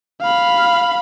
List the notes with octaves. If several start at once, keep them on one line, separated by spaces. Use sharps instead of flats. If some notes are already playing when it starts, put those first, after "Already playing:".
F5 B5